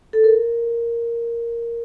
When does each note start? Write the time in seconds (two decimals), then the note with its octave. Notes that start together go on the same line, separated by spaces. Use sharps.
0.13 A4
0.24 A#4